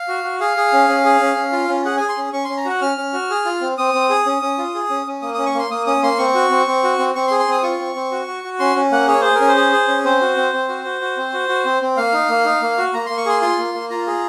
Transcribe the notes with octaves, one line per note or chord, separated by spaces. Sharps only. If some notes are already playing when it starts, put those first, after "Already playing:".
Already playing: F5
F#4
F#4
G#4 F5
G#4
C#4
C#4
G#4
C#4
C#4
F4
C#4
G#4 F#5
G#4 G#5
C6
C#4
C#4 C#6
C#4 C6
A#5
F#4 F#5
C#4 F6
C#4
F#4
G#4
F4
C4
C4 D#6
C4
G#4
C#4
C#4
F4
G#4
C#4
C#4
A#3 D#6
C#4 D#6
C#6
A#3 C6
A#3 D#6
C#4 D#6
A#3 C6
C4 C#6
F#4
C4
C4
F#4
C4
C4 C#6
C6
G#4
C6
C4 D#6
F4 C#6
C4
C4
F#4
F#4
F#4
C#4 C6
C#4
A#3 F#5
G#4 C#5
G#4 C5
C#4 A#4
C5
G#4
G#4
C#4
C4 C5
F#4
C4
C4
F#4
F#4
F#4
C4
F#4
F#4
C4
C4
A#3 F5
D#4
A#3
D#4
A#3
F#4
A#3 A#5
A#3 C6
C#6
G#4 C6
F4 C6
A#3
A#3
F4 A#5
G#4